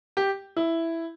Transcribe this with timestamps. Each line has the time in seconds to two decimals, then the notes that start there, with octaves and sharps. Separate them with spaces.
0.17 G4
0.56 E4